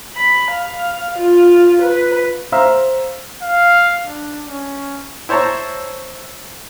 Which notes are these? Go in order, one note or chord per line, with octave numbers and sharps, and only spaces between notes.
B5
F5
F4
B4
C5 E5 F5 A#5 E6 F6
F5
D4
C#4
E4 C5 C#5 A5 A#5 C#6